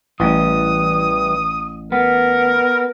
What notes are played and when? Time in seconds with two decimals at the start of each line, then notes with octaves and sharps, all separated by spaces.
0.20 A1 E3 G3 D#6
1.92 B3 A#4